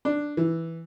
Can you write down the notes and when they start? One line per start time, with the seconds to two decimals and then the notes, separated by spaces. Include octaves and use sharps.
0.05 D4
0.37 E3